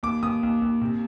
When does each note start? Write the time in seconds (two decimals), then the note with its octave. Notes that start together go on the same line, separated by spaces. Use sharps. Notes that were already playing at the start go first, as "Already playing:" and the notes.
0.03 D#2 D6
0.23 D#2 D#6
0.43 D#2
0.62 D#2
0.82 C3